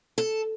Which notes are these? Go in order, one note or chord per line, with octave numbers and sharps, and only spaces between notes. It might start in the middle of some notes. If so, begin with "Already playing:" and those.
A4